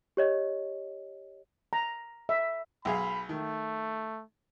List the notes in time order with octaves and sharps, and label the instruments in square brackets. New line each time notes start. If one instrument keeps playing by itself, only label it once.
[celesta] G4 C#5 D#5
[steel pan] A#5
E5
[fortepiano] B1 G#4 F5 [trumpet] B5
[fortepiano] D#3 [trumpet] A3